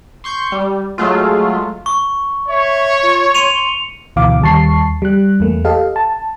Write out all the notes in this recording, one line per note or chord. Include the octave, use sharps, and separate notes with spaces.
C6 C#6 G6
G3
F#3 G#3 A3 F4
C#6
C#5 E5
F4
C6 C#7 D#7 F7
D2 B2 E3 F5 D6
D#2 G3 A5 C#6 C7
G3 F#6
E2 A3 A#3
G4 A4 D#5 F5
A5